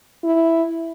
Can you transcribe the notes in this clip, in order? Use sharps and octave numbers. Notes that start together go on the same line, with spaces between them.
E4